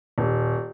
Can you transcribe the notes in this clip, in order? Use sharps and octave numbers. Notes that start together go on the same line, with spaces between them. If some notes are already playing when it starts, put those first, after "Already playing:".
D#1